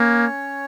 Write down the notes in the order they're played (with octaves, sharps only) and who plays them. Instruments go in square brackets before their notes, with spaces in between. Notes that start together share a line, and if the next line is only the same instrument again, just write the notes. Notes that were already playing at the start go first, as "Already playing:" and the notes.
Already playing: [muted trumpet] A#3 [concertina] C#4 C#5